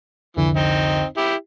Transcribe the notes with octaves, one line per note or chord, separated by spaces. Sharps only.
C2 F2 D3 E3
C4 D#4
E4 G4